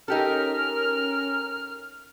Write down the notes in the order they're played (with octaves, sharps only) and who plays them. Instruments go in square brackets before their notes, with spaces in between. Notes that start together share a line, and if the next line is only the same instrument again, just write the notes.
[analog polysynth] C#4 A#4 [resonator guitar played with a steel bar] D#4 G4 A4 [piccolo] F6